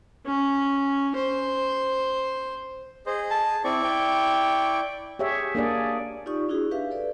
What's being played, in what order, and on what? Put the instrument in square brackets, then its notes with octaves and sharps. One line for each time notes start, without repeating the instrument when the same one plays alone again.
[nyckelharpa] C#4
C5
[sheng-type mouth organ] G#4 D#5 [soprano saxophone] C5
[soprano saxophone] A5
[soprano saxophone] C4 [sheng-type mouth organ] E4 D5 C#6
[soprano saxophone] G5
[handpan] G4 G#4 C#5 E5
A#3 D4 G#4 D5
[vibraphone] D#4 F4 G4 D5 C#6 D#6
D4 E4 F#4 G#4
G4 B4 E5 F5
A4 B4 D5